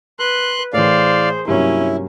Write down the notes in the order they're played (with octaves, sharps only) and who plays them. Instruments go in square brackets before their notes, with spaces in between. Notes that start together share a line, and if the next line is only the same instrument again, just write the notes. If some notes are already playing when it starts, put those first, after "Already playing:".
[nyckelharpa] B4 [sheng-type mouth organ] C6 F#6
[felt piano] A2 E3 [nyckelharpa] G#4 C5 [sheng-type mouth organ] D5 F5
[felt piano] G2 C3 F#3 [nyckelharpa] A#3 C#4 [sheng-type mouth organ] E4